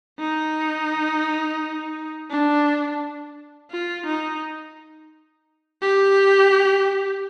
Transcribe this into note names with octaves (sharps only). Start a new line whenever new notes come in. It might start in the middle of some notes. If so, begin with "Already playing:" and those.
D#4
D4
F4
D#4
G4